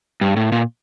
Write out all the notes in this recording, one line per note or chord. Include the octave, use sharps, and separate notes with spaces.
G2
A2
A#2